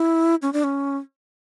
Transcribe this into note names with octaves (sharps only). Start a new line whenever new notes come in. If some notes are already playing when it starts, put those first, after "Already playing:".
Already playing: E4
C#4
D4
C#4